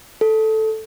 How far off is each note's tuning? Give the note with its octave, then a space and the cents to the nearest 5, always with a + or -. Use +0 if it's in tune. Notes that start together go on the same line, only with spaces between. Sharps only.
A4 -5